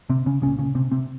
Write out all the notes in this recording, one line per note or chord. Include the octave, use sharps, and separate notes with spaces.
C3 C4
C#3 C#4
C2 A#2 C#3 C#4
C#3 C#4
C3 C4
C3 C4